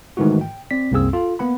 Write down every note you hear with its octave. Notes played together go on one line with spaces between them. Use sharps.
G#2 D#3 E3 A3 E4 F#4
G5
C4 D5 B6
C2 F#2 A#3 C4 G#4 E6
F4 A4
A#3 B3 F#5 B5